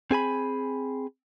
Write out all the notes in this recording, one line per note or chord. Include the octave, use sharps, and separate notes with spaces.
C4 G#4 G#5 B5